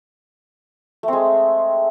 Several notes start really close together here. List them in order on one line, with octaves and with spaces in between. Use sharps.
A3 C4 G#3